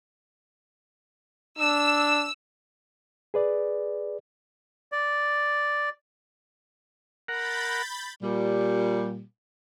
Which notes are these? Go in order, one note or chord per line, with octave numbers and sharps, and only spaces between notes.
D4 E6
G#4 B4 D5
D5
A#4 F#5 B5 G6 A6
A#2 G3